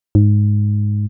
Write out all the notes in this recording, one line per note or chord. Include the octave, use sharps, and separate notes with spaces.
G#2